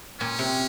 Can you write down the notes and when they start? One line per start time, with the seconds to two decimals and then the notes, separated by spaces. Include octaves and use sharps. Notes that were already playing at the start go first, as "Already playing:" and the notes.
0.20 A#2 C#4
0.39 C3